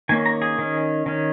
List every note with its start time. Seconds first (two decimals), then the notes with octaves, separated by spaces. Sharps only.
0.09 D#3 A#3 C#4 G#5
0.26 A#5
0.42 G#4
0.59 D#3 C#4
1.06 D#3 C#4